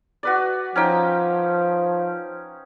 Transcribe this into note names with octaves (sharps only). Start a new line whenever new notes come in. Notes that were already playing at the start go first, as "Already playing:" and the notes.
F#4 B4 D5
F3 C#4 D#4 G5